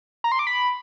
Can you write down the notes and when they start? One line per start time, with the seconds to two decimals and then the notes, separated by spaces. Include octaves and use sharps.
0.24 A#5
0.32 C6
0.39 D6
0.47 B5